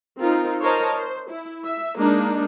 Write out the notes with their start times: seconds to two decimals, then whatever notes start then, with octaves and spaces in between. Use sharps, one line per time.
0.21 C4 D#4 F4 A#4
0.61 A#4 C5 C#5 D#5 A5 A#5
0.96 C5
1.30 E4
1.64 E5
1.99 G#3 A#3 D4 D#4